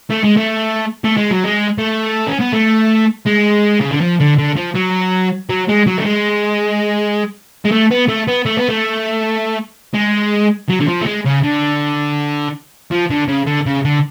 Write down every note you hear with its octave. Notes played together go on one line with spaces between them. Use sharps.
A3
G#3
A3
A3
G#3
F#3
G#3
A3
C#4
B3
A3
G#3
C#3
D3
F3
D3
D3
F3
F#3
F#3
G#3
F#3
A3
G#3
G#3
A3
B3
A3
B3
A3
B3
A3
G#3
F#3
D3
F3
A3
G#3
C#3
D3
F3
D3
C#3
D3
C#3
D3